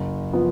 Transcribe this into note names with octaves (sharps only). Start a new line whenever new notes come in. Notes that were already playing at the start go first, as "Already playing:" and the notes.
Already playing: F#1
F3 B3 F4